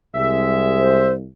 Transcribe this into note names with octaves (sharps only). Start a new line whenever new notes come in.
C2 G#3 E5
C5